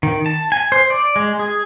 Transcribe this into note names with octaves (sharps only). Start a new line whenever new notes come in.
D#3
A5
G#5
C5
D5
G#3
G#4